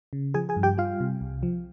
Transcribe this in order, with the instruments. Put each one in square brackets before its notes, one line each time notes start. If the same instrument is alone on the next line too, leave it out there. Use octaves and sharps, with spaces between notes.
[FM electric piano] C#3
F3 G#4 G#5
G#4 G#5
G2
G4 G5
G3 F4 F5
C3
C2
F3